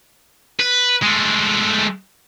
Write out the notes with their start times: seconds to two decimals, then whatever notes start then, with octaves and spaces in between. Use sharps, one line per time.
0.59 B4
1.02 G#3 A3